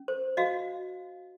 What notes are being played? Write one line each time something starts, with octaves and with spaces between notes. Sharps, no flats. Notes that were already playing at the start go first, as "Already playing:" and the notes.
Already playing: C#4
C5
F#4 D#5 F5